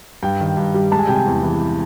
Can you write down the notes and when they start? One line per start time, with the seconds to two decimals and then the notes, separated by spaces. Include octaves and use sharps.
0.23 G2 G5
0.40 D#3
0.57 G2
0.74 G3
0.91 G#3 A5
0.99 G#5
1.07 C3 G5
1.15 G#5
1.26 E2
1.43 E3